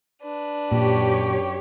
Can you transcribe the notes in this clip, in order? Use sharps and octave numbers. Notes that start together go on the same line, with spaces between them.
D4 B4
F#2 A#2 G4 C#5